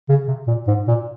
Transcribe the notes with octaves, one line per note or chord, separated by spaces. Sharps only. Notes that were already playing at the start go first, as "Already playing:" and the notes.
C#3
C3
A#2
G#2
A#2